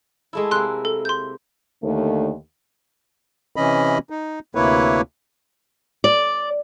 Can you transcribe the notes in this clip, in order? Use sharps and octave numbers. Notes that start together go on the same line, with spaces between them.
G#3 A3 E4
C3 A#3 C6 F#6
A4
C6 G6
D#2 D3 A3
C3 E3 C#4 D#5 B5
D#4
D2 C3 A#3 E4 B4 C#5
D5